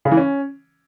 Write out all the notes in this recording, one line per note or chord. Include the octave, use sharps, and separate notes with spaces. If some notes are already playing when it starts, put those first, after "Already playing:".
C#3
E3
C#4